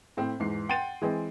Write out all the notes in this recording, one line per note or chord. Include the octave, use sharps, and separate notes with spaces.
A2 C4
E2 G#2 C7
F#5 G5 C6 A6 D#7
E3 G#3 C4